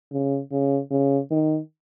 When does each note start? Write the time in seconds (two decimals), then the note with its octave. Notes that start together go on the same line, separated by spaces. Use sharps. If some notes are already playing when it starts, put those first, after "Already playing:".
0.12 C#3
0.52 C#3
0.91 C#3
1.31 D#3